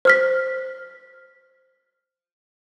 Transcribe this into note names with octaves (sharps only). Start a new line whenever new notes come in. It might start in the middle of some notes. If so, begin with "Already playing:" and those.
C5 F6 B6